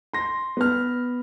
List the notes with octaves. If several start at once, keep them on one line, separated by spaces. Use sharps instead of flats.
C6 A#6
B3 F6